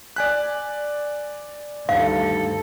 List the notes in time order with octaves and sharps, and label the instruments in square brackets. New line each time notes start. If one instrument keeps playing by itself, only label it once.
[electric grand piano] D5 G#5 F#6 [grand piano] B6
[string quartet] D2 A4 [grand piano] G2 D#3 [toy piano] F5